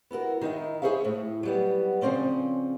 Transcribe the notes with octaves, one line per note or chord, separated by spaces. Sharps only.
B3 E4 F#4 A#4
D#3 D#4 E4
E4 G#4 C5 C#5 E5 F5
A2 A3
F#3 G3 B3
C#3 F3 A3 C4 C#4 D5